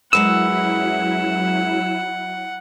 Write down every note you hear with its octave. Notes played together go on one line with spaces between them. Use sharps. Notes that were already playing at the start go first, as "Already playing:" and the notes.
F#2 F#3 G#3 E4 B4 F#5 E6